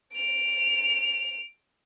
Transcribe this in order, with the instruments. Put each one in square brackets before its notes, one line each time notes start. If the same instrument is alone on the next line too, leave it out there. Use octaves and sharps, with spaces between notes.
[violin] D7 F7